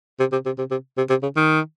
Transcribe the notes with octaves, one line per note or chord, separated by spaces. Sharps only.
C3
C3
C3
C3
C3
C3
C3
C#3
D#3